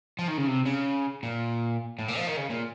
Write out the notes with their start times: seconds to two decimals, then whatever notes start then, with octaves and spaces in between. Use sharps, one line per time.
0.19 F3
0.28 D#3
0.38 C#3
0.47 C3
0.66 C#3
1.23 A#2
1.99 A2
2.08 A#2
2.17 F3
2.27 D#3
2.37 C#3
2.50 A#2